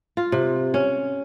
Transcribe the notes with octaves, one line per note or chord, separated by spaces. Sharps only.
F4
C3
C#4